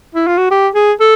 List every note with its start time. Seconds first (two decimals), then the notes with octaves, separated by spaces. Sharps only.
0.15 E4
0.27 F4
0.38 F#4
0.51 G4
0.75 G#4
1.00 A4